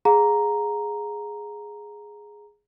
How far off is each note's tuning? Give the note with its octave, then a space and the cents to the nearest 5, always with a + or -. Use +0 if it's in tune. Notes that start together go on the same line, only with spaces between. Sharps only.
G#4 +0 F5 +45 A#5 +0